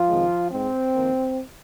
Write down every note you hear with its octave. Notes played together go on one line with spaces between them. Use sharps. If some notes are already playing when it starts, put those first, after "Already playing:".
Already playing: F3 F4
F2 C3 D#3 G#3
G#2 G#3 C4
F2 D#3 A#3